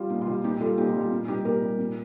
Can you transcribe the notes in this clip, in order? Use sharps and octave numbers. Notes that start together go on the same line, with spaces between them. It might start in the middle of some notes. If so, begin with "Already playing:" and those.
Already playing: G3 F4
A#2 D#4
F4
G3
F4
A#2 D#4 G4
G3 F4 A4
A#2 D#4 G4
F4
G3
F4
A#2
G3 D#4 G4
A#2 G4 A#4
G3
A#2